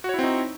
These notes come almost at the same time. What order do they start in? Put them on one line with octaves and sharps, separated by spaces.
F#4 C#5 E4 C4 D#4